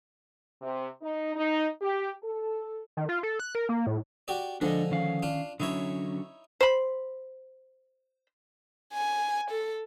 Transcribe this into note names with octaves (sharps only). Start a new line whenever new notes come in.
C3
D#4
D#4
G4
A4
D#3
F4
A4
F#6
A#4
A#3
A2
F#4 G4 D5
D3 F3 G#3 D4 A4 D#5
D#3 C#4 F5
D4 F4
D3 F#3 C#4 D#4 E4 C#5
C5 B5
G#5
A4